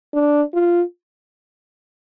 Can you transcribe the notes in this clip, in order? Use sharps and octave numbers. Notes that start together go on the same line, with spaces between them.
D4
F4